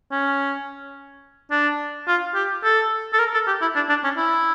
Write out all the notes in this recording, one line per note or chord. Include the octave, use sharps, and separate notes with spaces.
C#4
D4
F4
G4
A4
A4
A#4
A4
G4
E4
D4
D4
C#4
E4